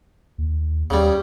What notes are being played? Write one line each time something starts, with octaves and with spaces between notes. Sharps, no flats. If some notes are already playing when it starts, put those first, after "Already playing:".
D#2
D#2 C#3 G3